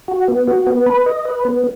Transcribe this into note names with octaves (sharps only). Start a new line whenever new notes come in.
F#4
B3
F#4
B3
B4
D#5
B4
B3